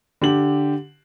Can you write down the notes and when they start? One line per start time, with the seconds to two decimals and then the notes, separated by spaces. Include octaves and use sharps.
0.21 D3 G4 F#7